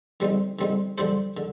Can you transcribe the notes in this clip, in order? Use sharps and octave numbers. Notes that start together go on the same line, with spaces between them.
D3 G3 C4 D#4
D3 G3 C4 D#4
D3 G3 D4 A4 C5
D3